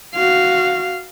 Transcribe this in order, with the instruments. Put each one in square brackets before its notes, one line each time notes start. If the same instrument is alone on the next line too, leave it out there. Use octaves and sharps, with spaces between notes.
[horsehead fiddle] F#4 F5